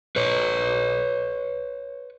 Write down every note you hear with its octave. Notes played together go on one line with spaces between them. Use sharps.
B4 C#5